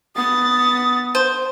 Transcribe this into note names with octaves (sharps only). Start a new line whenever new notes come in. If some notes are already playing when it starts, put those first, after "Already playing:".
B3 D#6 A6
C5